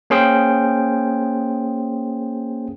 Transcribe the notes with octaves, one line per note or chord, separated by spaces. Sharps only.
A#3 C#4 G#4 C5 G5